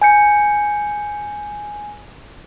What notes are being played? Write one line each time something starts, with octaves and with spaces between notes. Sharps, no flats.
G#5 G6 C#7